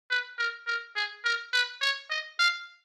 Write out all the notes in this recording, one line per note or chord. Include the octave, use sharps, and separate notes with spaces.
B4
A#4
A#4
G#4
A#4
B4
C#5
D#5
F5